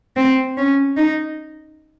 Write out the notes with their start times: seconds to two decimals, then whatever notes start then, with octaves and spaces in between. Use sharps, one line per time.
0.17 C4
0.57 C#4
0.97 D#4